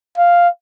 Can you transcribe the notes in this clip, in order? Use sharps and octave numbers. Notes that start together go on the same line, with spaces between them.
F5